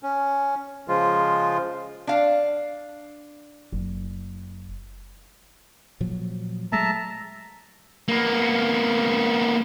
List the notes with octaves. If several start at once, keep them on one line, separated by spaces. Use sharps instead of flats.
C#4
C#3 F3 G#3 F4
D4 F5
F#1
A#2 F3 F#3
F#3 G#3 A3 E5 A5 A#5
A#3 B3